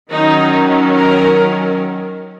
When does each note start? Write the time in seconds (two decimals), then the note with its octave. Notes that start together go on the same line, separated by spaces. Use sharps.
0.11 D#3 F#3 C#4 D#4
0.95 A#4